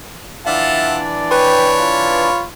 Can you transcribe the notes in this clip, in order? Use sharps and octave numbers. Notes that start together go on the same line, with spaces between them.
E3 D4 F4 D5 E5 F#5 A5
B4 C#5 G5 B5
F4